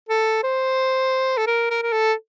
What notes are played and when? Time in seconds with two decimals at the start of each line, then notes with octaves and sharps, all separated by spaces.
0.09 A4
0.44 C5
1.38 A4
1.47 A#4
1.71 A#4
1.82 A#4
1.93 A4